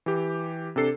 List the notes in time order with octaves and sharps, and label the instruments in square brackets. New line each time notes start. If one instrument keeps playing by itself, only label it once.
[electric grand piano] E3 G4
C3 D4 A4 C7